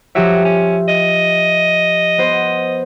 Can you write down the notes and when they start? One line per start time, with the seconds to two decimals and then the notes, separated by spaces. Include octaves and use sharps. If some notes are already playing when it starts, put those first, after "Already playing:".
0.15 F3 F#3 G4 E5
0.45 C#4
0.88 D#5
2.18 B3 C5 D7